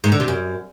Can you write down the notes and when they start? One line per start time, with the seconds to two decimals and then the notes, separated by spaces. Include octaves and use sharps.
0.04 G#2
0.12 D3
0.20 C3
0.28 F#2